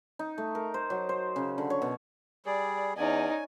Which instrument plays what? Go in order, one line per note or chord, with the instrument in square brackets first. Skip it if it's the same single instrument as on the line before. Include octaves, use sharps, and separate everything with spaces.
[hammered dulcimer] D#4
A3
A#4
C5
F#3
C5
C#3
D3
C#5
B2
[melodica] G3 G#4 [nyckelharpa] D5
[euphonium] E2 [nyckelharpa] C#4 D5 [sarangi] D#4 [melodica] G#5